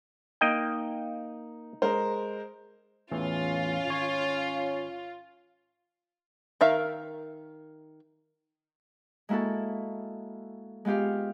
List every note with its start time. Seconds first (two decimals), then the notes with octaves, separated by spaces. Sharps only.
0.41 A#3 D#4 D#5 G5
1.82 G#3 A#4 C5
3.12 E2 A2 E3 C#4 F4
3.87 G#1 C#5
6.61 D#3 A#4 E5 F5
9.29 G#3 A#3 E4 F#4 A4
10.85 G#3 B3 F4 G4 F5